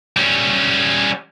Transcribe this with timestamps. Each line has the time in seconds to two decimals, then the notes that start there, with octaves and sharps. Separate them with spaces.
0.17 G3 C#4